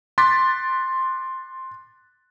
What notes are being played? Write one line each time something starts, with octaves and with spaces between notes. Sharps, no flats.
C6 D6 F#6 A6 B6